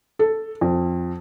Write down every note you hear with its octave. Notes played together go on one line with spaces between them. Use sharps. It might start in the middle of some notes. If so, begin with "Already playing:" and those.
A4
F2